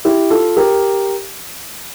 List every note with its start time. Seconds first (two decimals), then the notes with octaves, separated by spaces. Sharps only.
0.05 E4 G4
0.30 F4 A4
0.57 G4 A#4